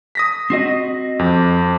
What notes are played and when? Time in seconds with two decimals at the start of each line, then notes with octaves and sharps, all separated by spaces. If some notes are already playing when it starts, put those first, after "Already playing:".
0.15 D#6 A#6 B6
0.50 C4 F#4 D#5 C7
1.19 F2